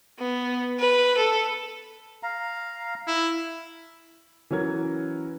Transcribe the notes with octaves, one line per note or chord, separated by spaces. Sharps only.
B3
B4
A4
F5 A#5
E4
E3 F#3 C#4 A#4 G#6